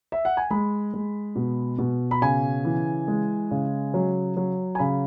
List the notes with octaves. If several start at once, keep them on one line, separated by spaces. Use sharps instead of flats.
E5
F#5
G#5
G#3 B5
G#3
B2
B2
B5
C#3 G#5
E3
G#3
C#3
F#3
F#3
G#5
C#3 B5